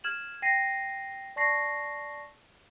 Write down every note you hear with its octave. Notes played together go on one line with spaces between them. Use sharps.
F6 G#6 E7 F#7
G5 A#6 C7 D#7
D5 A5 C#6 A#6 C7